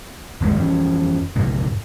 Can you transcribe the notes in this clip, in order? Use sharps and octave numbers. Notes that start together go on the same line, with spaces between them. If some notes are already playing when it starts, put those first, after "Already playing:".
G1 D#2 C3 G#3
F2 E3 C#4
F2 G#2 C3